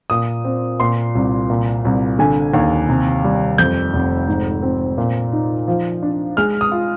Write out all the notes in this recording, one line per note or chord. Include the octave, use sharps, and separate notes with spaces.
A#2 D#6
C4
A#2 C6
C2
A#2
C2
D3 G#5
D#2
C3
G3
F2 G6
F1
G#2
C4
A#2
D#4
F3
D4
G#3 F6
D#6
F4